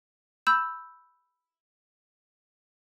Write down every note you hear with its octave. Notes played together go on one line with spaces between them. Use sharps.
B5 E6 G6 E7